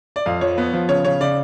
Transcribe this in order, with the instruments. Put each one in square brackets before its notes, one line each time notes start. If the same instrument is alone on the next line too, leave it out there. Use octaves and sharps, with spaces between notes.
[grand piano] D5
F2 F5
F3 C#5
B3
F3
C#3 C#5
C#3 C#5
C#3 D5